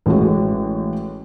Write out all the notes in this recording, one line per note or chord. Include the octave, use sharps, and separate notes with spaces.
A1 G#3 F#4